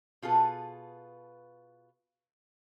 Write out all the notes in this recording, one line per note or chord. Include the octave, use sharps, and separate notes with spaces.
B2 F4 G#4 A4 B4